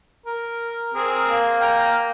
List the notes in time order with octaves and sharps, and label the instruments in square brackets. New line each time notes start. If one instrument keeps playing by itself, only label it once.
[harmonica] A#4
C4 G#4 A#4
[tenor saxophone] A#3
[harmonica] G5 A#5 F6